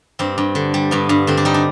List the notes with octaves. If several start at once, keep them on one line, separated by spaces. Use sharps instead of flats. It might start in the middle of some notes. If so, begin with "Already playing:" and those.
G2 C4
G2
D3
G3
G2 B3
G2
D3 C4
D4
G3 D#4
D4